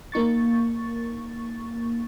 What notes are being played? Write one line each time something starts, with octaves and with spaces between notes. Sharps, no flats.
A#3 D#4 C#6 A6